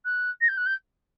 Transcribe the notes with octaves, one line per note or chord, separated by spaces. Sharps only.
F#6
A#6
G6
F#6
G6